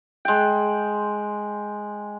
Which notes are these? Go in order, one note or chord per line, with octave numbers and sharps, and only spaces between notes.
G#3 G5